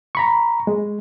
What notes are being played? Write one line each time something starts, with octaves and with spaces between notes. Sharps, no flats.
A#5 B5 C#6
G#3